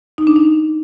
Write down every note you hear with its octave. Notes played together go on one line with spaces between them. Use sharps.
D#4
D4
D#4